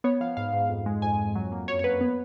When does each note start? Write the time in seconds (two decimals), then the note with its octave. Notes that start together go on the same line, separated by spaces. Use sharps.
0.04 B3 C#5
0.20 F3 F5
0.37 G#2 F5
0.53 G#2
0.70 F2
0.86 G#3
1.02 F2 G#5
1.19 F2
1.35 F#3
1.52 A#3
1.68 F#2 C#5
1.79 C#5
1.84 F#3 B4
2.01 B3